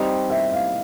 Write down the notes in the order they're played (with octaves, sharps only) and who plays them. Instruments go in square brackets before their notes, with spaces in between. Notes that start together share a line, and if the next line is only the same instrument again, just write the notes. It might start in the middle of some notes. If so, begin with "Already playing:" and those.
Already playing: [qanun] G3 C4 D#4 [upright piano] D#5
[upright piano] E5
F5